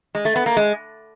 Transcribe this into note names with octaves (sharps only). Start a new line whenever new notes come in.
G#3
A3
B3
A#3
G#3